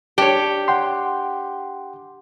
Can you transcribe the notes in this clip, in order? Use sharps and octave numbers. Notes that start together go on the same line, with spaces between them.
D4 G4 C#5
F#5 G5 C6